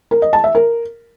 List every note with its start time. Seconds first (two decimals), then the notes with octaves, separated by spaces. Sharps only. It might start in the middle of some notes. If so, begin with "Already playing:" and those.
0.11 A#4
0.22 D#5
0.33 A5
0.44 E5
0.55 A#4